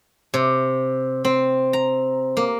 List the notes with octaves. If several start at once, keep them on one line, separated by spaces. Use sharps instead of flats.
C3
C4
A#5
A#3